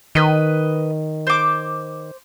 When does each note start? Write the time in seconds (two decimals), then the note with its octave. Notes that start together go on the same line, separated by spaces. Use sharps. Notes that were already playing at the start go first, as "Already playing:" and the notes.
0.15 D#3 B4 D#5
1.27 C5 D6